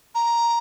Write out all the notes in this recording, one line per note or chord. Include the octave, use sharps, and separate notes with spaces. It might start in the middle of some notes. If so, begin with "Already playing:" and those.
A#5